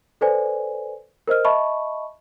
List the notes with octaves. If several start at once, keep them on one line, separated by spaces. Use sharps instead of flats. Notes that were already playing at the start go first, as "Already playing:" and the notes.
A4 B4 C5 D5 G#5
A#4 C5 D#5 F6
D#5 E5 A5 B5 C#6